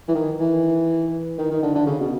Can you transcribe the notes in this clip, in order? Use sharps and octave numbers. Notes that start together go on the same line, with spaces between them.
E3
D#3
E3
D#3
D#3
D3
D3
C#3
B2